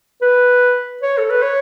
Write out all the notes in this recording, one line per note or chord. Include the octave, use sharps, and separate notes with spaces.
B4
C#5
A4
B4
C#5